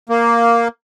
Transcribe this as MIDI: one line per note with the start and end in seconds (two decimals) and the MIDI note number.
0.09 0.68 58